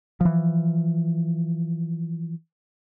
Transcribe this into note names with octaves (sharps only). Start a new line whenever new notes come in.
E3 F3